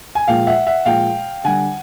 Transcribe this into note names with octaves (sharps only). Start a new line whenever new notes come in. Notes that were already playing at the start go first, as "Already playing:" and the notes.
G#5
A#2 F3 G#3 F5 G5
E5 F#5
E5 F#5
A#2 F3 G#3 F5 G5
D3 G3 F#5 G#5